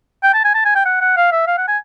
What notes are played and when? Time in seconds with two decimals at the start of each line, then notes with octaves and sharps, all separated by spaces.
0.23 G5
0.34 A5
0.44 G#5
0.55 A5
0.65 G#5
0.75 G5
0.85 F#5
1.01 F#5
1.17 F5
1.32 E5
1.47 F5
1.58 F#5
1.68 G#5